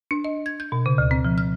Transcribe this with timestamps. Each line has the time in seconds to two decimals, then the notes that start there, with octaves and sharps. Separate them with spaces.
0.11 D4
0.24 D#5
0.46 G#6
0.60 G6
0.72 B2
0.86 C#3
0.98 D2
1.11 C4
1.25 F3
1.38 F6